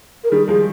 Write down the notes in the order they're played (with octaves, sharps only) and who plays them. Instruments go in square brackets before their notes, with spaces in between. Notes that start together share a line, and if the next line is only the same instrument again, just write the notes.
[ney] A#4
[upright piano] D#3 G3 [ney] G#4
[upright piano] F3 G#3 [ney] G#4